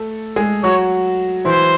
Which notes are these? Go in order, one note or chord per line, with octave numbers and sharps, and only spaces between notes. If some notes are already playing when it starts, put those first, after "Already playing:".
Already playing: A3 A4
G#3 G#4
F#3 F#4 C#5
E3 E4 C5